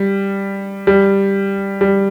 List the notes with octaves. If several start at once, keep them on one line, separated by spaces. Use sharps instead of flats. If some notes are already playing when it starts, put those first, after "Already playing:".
Already playing: G3
G3
G3